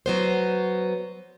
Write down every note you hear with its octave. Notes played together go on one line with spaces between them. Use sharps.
F#3 B3 C5